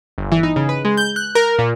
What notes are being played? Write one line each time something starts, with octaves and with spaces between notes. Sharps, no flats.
G1
E3
D#4
C#3
B4
G#3
G6
F#6
A#4
A#2